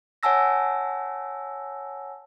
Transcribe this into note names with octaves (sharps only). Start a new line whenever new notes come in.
C#5 F#5 G#5 A5 E6 A#6